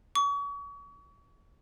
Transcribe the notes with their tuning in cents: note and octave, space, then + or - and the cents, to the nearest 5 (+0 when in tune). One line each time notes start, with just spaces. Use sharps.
C#6 +35